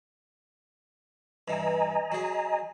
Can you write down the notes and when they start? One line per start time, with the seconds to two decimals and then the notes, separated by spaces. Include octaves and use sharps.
1.48 G2 E3 D#5 G#5 A#5
2.12 F#3 G#4